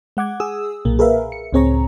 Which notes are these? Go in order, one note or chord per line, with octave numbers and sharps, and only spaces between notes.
G#3 F#5 D6 G#6
G#4 D#6 E6
B1 A#2 A#3
G#4 A#4 B4 E5 F5
C#7
C#2 A2 C4 G#4 C#5 A#5